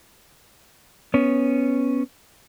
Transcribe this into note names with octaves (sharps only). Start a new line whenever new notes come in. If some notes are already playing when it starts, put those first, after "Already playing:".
B3 C#4